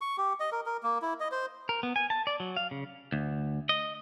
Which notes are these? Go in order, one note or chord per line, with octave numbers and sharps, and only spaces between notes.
C#6
G4
D#5
A#4
A#4
A#3
E4
D#5
C5
A#4
B3
G#5
A5
D5
F#3
F5
C#3
D2
D#5